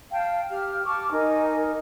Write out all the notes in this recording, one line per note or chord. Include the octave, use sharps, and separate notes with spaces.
F5 G5 A5
G4 F6
A5 C#6 D6 F6
D#4 A#4 G#5